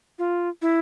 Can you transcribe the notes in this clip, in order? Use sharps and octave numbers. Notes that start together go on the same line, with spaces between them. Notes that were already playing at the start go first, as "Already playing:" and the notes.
F4
E4